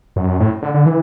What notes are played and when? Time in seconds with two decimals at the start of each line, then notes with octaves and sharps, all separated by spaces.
0.16 F#2
0.40 A2
0.63 D3
0.74 D3
0.86 E3